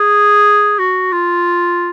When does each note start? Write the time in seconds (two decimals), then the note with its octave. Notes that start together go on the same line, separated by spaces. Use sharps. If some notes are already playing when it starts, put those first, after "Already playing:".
Already playing: G#4
0.79 F#4
1.12 F4